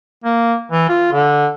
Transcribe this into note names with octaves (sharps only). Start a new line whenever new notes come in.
A#3
E3
F4
D3